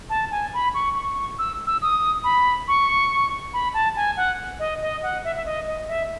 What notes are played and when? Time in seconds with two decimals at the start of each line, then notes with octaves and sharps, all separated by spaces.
0.10 A5
0.31 G#5
0.54 B5
0.74 C#6
0.96 C#6
1.39 E6
1.67 E6
1.82 D#6
2.24 B5
2.68 C#6
3.54 B5
3.74 A5
3.96 G#5
4.17 F#5
4.59 D#5
4.82 D#5
5.03 F#5
5.24 E5
5.36 E5
5.46 D#5
5.67 D#5
5.88 E5